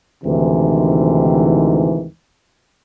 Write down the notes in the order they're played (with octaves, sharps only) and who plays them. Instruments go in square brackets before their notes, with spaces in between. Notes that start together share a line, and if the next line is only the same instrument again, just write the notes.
[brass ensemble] D2 G#2 C3 D#3 E3